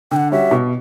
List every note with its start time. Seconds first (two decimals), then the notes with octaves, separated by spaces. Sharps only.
0.11 D3 G5
0.16 F#5
0.32 G3 C#4 F#4 E5
0.51 B2